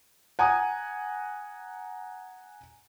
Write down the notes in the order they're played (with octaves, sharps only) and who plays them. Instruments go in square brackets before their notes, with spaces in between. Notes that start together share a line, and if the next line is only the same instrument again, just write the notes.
[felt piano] F#5 G#5 A#5 D#6